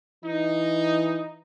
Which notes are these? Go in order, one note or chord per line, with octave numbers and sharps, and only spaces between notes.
E3 D#4